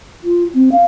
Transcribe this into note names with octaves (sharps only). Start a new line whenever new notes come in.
F4
C4
F5